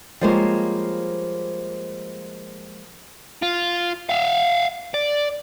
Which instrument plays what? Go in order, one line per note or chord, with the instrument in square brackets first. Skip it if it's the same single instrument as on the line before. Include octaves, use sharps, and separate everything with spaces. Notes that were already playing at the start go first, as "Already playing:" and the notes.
[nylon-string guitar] F3 G3 G#3 A#3 C5 C#5
[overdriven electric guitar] F4
E5 F5
D5